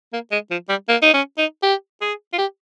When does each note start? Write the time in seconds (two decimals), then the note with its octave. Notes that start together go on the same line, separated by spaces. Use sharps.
0.13 A#3
0.32 G#3
0.51 F3
0.69 G3
0.89 A#3
1.02 D#4
1.14 C#4
1.38 D#4
1.63 G4
2.02 G#4
2.33 F4
2.38 G4